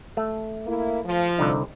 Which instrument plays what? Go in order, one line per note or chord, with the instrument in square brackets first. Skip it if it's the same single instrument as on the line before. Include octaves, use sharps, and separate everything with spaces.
[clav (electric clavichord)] A3
[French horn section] A#3 E4
F3
[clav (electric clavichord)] C2 D3 D#4